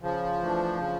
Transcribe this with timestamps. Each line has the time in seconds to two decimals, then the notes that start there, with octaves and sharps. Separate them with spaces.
0.02 C#3 F3
0.41 E3 A3 D4
0.79 C#3